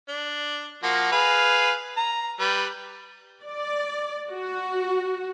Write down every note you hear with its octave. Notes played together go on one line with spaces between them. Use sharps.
D4
F3 A#3 F#4
G#4 B4 F5
A#5
G3 B4
D5
F#4